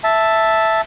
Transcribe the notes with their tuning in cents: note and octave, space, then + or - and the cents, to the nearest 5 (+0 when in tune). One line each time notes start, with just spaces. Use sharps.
E5 +0 A5 +0